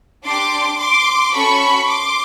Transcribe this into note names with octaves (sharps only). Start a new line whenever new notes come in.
D4 G4 C6 D6
C6 D6
C#4 F#4 A4 B5 C#6
C6 D6